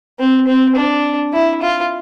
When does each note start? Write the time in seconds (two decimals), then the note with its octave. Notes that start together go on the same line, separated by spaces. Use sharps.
0.19 C4
0.47 C4
0.76 D4
1.33 E4
1.62 F4